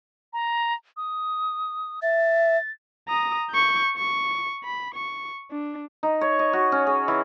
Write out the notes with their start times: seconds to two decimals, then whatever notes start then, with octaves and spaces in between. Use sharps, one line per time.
0.33 A#5
0.97 D#6
2.02 E5 A6
3.08 A#5 D#6
3.50 C#6 G6
3.97 C#6
4.64 B5
4.94 C#6
5.51 D4
6.03 D#4
6.21 C#5
6.39 D#5
6.53 F#4
6.72 C#4
6.87 G#4
7.08 E3